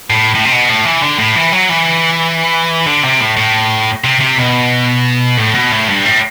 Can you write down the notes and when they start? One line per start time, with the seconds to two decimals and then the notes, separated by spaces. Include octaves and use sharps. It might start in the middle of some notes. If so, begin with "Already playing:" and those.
0.10 A2
0.35 A2
0.45 C3
0.52 B2
0.69 A2
0.85 E3
1.02 D3
1.19 A2
1.36 E3
1.52 F#3
1.69 E3
2.86 D3
3.03 C3
3.20 A2
3.37 A2
4.04 C3
4.21 C3
4.37 B2
5.38 A2
5.55 B2
5.72 A2
5.88 G2
6.05 A2